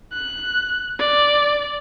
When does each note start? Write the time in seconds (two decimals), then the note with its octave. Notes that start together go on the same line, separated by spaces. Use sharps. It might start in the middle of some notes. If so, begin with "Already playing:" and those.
0.13 F#6
0.99 D5